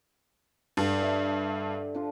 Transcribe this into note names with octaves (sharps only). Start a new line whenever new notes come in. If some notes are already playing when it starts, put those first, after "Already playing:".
G2 D3 G4
A4 E5
F3 D4 F4